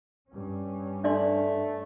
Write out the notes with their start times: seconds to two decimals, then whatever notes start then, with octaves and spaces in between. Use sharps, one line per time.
0.29 G2 C#4
1.04 A3 D4 D5 C6